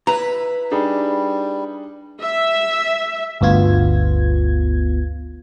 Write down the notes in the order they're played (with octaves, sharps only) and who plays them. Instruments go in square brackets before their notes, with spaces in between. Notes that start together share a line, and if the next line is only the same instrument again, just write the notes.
[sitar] E4 B4 [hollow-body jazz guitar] A#5
[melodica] G3 [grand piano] D4 D#4 G#4
[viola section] E5
[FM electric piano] G1 D2 B3 F4 G#6